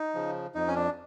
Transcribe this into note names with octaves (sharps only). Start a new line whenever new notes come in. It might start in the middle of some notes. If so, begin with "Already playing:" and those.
Already playing: D#4
C#3 F3
F2 D#4
C#4
D4